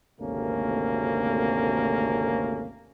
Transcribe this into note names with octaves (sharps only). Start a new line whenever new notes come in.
G#1 D2 C3 A3 A#3 C#4